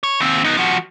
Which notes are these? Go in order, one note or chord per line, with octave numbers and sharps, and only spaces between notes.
C#5
D#2 C4
B3 D#4
F3 F#4